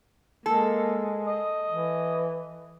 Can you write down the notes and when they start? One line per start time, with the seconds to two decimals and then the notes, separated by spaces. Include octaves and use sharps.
0.46 G#3 A#3 A4
1.26 D#5
1.70 E3